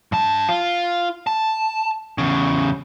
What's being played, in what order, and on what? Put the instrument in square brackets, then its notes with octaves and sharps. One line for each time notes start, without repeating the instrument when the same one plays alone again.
[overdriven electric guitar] G2 A5
F4
A5
E2 C#3